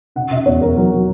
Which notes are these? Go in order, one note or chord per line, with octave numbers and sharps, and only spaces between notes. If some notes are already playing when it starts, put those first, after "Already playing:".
C#3 F#5
C#3 E5
E2 C#5
E2 A#4
F#3 A#4
F#3